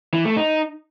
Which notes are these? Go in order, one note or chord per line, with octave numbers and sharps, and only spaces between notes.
E3
A3
D#4